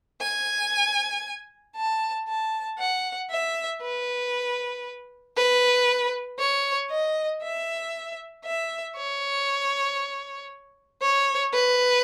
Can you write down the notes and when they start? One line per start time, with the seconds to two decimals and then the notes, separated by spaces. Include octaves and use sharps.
0.21 G#5
1.76 A5
2.28 A5
2.79 F#5
3.30 E5
3.81 B4
5.36 B4
6.38 C#5
6.90 D#5
7.42 E5
8.45 E5
8.96 C#5
11.02 C#5
11.53 B4